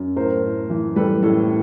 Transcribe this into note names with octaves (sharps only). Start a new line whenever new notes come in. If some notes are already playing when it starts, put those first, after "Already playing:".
Already playing: F#2
A2 A#4 C5
A2
E3
G3 A4 B4
A2 A4